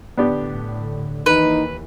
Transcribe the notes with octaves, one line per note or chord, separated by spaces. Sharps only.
A2 D3 B3 D4 G4
D#2 E3 D#4 B4